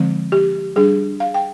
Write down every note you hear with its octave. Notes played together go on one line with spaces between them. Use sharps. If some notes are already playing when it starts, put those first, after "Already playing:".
Already playing: D3 F3 G#3 C4
G4
G3 D4 G#4
F5
G5